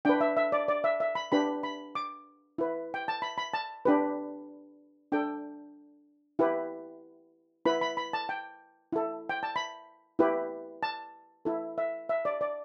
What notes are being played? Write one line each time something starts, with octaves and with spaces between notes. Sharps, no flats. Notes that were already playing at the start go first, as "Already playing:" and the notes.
D4 B4 G5
E5
E5
D5
D5
E5
E5
B5
D4 G4 B4 B5
B5
D6
E4 B4
G5
A5
B5
B5
A5
D4 G4 B4
D4 A4 G5
E4 G4 B4
E4 B4 B5
B5
B5
A5
G5
E4 A4
G5
A5
B5
E4 G4 B4
A5
E4 A4
E5
E5
D5
D5